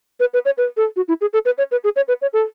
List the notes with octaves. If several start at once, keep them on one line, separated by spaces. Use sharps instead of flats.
B4
B4
C#5
B4
A4
F#4
E4
G#4
A4
B4
C#5
B4
G#4
C#5
B4
C#5
A4